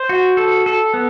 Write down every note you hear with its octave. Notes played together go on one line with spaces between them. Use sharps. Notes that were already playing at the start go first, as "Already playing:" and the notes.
Already playing: C5
F#4
A4
A4
B3